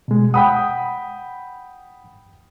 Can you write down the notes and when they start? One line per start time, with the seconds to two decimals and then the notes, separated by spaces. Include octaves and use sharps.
0.08 B2 G#3
0.34 F#5 G5 B5 D#6